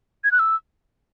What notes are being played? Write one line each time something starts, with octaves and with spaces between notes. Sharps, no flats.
G#6
F#6
E6